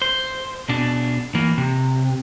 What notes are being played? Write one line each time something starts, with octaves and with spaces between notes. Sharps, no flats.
C5
B2 D4
E3 A#3
C3